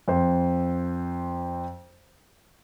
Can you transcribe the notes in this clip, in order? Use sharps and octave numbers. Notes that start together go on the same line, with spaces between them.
F2 C5